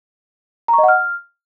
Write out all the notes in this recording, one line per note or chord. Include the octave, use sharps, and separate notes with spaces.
A#5
C#6
D#5
F#5
F6